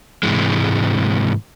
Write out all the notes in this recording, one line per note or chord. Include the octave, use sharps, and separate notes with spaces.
G#2 C3 E3 G#3